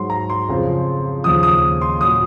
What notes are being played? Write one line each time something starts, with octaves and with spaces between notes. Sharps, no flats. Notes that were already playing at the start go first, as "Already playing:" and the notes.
Already playing: G#2 F#3 C6
A#5
C6
F2 C#3 F3
D#2 C#3 F3 D#6
D#6
C6
A#2 F#3 D#6